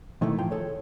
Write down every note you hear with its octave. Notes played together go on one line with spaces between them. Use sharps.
B2 D#3 E3 A3 E4
A2 F3 F4 G5 C6
G#4 A4 C#5